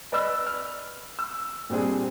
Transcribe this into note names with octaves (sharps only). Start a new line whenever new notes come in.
B4 D5 D#5 B5 E6
F6
E6
A#2 G3 C4 D4 G#4